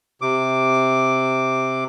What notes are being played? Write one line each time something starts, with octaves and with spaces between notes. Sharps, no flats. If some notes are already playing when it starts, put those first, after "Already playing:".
C3 D6